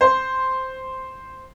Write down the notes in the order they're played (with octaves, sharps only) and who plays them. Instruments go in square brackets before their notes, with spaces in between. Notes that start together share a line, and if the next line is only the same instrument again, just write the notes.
[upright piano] C5